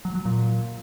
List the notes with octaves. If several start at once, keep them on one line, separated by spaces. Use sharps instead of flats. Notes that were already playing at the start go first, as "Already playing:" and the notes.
F#3
F#3
A#2